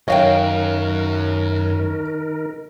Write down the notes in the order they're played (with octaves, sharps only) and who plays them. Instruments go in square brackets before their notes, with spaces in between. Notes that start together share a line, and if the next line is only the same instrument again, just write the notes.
[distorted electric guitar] F#2 [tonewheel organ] D#3 A#4 [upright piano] C#5 [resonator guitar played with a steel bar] D#5 F5 G5